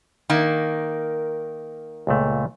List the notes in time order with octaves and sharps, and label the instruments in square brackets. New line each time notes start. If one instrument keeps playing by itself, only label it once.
[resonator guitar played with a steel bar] D#3 A#3
[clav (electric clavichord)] C#2 A#2 A3